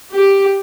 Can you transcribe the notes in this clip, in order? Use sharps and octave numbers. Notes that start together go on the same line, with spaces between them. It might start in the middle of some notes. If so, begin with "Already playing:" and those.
G4